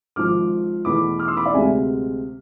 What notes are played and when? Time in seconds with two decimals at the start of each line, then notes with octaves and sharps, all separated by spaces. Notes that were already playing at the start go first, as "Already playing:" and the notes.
0.16 G#1 G#2 F3 D6 F6
0.85 E2 B2 A3 B5 D6
1.19 D6 F6
1.28 C6 E6
1.37 B5 D6
1.46 D5 F5
1.54 D2 C3 G#3 C4 E5 G#5